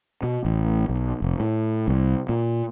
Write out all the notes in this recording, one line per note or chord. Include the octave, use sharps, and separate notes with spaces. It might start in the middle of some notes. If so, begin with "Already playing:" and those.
B2
A1
B1
F1
A2
C2
A#2